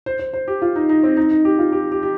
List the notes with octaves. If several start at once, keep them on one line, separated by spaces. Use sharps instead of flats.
C5
C5
C5
G4
F4
D#4
D#4
C4
D#4
D#4
G4
F4
G4
G4
G4